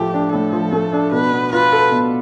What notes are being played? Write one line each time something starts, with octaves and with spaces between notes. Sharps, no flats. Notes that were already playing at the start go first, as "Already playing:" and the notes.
Already playing: A2 F3 A3 G4
D4
A2 A4
F3
A3
D4
B2 B4
B3
F4 B4
A4
B2